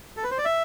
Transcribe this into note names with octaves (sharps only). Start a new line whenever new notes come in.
A4
B4
C5
D5
E5